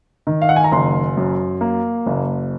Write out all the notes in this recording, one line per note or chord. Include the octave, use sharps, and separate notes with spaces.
D#3
F5
F#5
G#5
A#5
F#1 C6
F#2
A#3
F#1